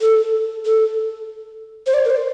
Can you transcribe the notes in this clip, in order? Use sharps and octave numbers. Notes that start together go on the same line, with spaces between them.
A4
A4
C5
D5
A#4
C5